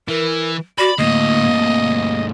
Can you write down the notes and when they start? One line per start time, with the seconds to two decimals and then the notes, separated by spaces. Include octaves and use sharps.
0.08 E3 A#4
0.78 F#4 D5 B5
0.98 D2 A2 A#3 D#5
1.46 D2 G2